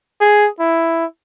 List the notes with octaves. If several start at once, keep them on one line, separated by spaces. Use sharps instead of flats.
G#4
E4